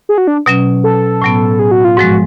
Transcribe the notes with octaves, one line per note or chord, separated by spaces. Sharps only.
G#4
F#4
D4
B2 F#3 C#4
A4
A2 F#3 B3
G#4
F#4
F4
G#2 F3 G#3 F#4